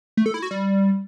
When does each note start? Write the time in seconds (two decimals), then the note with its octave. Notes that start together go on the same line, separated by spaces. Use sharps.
0.17 A3
0.26 A4
0.34 E4
0.42 F#4
0.51 G3